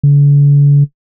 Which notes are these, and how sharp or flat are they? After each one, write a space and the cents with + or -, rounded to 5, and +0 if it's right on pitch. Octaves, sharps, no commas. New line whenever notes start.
D3 -45